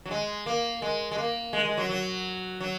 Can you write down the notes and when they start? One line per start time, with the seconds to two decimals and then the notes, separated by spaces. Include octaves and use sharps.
0.06 F#3
0.11 G#3
0.46 A#3
0.82 G#3
1.12 G#3
1.18 A#3
1.53 G#3
1.65 G#3
1.77 F#3
1.89 F#3
2.61 F#3